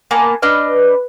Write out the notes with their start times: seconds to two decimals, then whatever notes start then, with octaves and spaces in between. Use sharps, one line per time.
0.11 A#3 B3 G#5 A5
0.42 D4 B4 D#5 F6